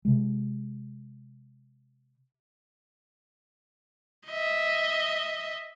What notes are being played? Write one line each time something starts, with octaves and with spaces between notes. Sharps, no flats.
C3 G#3
D#5 E5